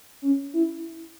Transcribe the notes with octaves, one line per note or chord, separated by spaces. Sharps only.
C#4
E4